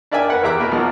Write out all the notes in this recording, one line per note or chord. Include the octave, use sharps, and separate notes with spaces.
D4 A#4 D5 E5 G5 G#5
A#4 B4 F#5
E2 G4 E5 A#5 D6 F#6
B2 A#3 B3
B1 F3 F#3 F6